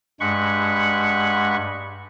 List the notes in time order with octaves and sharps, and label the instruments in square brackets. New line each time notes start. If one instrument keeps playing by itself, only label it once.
[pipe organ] G2 G#3 F#5 B5 C#6